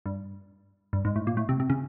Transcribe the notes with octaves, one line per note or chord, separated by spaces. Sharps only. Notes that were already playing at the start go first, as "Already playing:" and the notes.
G2
G2
G#2
A2
A#2
A2
C3
C3
C#3